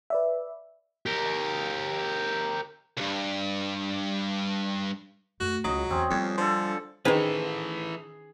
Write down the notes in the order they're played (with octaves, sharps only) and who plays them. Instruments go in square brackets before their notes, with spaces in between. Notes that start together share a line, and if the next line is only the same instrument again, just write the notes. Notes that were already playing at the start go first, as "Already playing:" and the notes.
[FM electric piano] B4 D5 E5
[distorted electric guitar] G4 A#4
C#2 G2
[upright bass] F#2 A3 [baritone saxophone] F#4
[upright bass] C#2 [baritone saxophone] F#3 [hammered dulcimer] D#5
[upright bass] E2 [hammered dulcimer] C4 C#4 G#4
[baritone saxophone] F2 [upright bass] G3 B3 [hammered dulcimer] C#5 D5
[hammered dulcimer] D3 A4 [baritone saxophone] F3
[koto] D#3 B4 [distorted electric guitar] E3 A4 [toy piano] C#4 D#4 C5 [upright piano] G#4